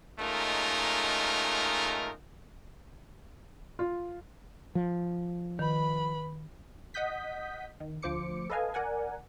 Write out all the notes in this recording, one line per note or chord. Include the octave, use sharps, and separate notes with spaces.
G#3 A3 C#4 D#4 F4 A#4
F4
F3
D#3 B4 B5
D#5 F#5 D#6 G6 B6
D#3
D2 F3 C5 D6 C#7
A4 B4 D#5 F5 G#5
A#4 D5 F#5 G#5